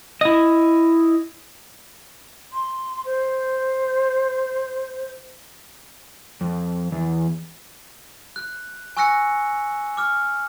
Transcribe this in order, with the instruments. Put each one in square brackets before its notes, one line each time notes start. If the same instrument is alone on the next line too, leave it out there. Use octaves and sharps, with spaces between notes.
[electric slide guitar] E4 D#5
[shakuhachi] C6
C5
[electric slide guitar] F2
E2
[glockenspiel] F#6
G#5 C#6 E6 F#6 A#6 C#7
D6 F6